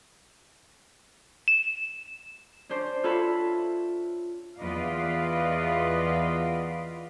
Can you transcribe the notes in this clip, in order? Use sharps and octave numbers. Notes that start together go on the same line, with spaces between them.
E7
C#4 D4 C5
F4 A4 B4 C#5 E5 B5
E2 F4 B4 D5 D#5 F5